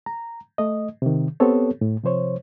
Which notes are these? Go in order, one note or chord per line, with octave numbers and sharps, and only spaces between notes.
A#5
A3 D#5
C3 D#3
B3 C4 G4 A4 C#5
A2
C3 F3 C5 C#5